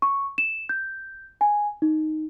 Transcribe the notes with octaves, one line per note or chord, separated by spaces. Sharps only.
C#6
E7
G6
G#5
D#4